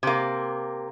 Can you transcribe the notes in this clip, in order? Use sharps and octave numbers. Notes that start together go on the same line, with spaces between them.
C3 A#3